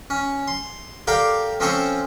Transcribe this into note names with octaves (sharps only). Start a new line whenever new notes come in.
C#4
C6
G4 A4 A#4 D5 F5 G5
F3 C4 C#4 A4 C5 C#6